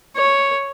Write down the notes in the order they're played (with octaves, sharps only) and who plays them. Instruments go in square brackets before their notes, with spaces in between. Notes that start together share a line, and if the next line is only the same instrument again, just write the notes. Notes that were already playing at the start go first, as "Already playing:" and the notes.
[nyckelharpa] C#5